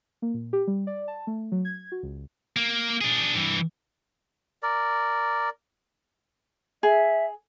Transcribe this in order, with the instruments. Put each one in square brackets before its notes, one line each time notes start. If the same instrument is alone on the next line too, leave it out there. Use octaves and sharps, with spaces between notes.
[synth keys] A#3
A#2
G4
G3
D5
A5
A3
F#3
G#6
F#4
C#2
[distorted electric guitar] A#3
D4 G#4
G2 E3
[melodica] A#4 D5
[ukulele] G#4 [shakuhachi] E5